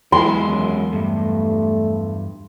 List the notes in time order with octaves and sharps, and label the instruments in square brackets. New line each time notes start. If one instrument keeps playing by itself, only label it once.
[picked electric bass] E2 F#3 [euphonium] E3 [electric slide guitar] G#3 A#3 G#4 [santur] C6
[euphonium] F#2
[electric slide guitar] G2 [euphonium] A3